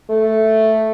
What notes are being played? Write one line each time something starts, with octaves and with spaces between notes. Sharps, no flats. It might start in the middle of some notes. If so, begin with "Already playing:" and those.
A3